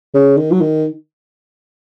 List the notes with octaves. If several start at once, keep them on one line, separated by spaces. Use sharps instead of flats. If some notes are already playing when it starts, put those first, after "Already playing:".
C#3
D#3
F#3
D#3